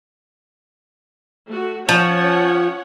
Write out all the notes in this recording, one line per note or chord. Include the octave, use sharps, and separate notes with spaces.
A3 F#4
F3 C#4 C#5 F#5